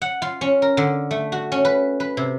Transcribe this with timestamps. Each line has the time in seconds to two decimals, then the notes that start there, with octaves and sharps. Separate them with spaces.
0.02 F#5
0.22 F4
0.41 C#4
0.62 A#4
0.77 D3
1.11 A3
1.32 F#4
1.52 C#4
1.65 B4
2.00 B4
2.17 C3